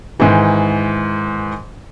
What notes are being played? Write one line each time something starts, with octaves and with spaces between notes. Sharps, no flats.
G#2 D#3 E3